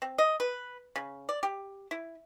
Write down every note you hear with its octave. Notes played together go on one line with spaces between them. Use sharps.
C4
D#5
B4
C#3
D5
G4
E4